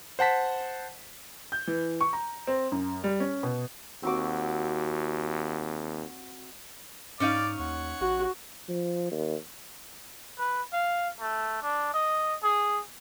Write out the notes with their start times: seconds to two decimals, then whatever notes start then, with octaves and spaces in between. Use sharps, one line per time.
0.19 C5 F#5 A5 B6
1.52 G6
1.67 E3
2.01 C#6
2.13 A#5
2.47 C4
2.72 F#2
3.04 G3
3.20 C#4
3.43 B2
4.03 D#2 C4 F#4 D6
7.20 G#2 C#4 D#4 D5 F5
7.59 D#2 C#5 F#5
8.00 A1 F#4
8.69 F3
9.11 D#2
10.39 B4
10.73 F5
11.20 A3
11.63 D4
11.94 D#5
12.43 G#4